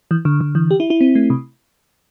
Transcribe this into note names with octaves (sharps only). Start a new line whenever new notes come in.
E3
D3
D3
E3
G4
E4
E4
C4
A3
C3